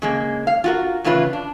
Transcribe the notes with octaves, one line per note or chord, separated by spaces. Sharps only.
C#3 G#3 A#3
F5
F4 F#4 A#4
A2 C#3 E3 F4 B4
D4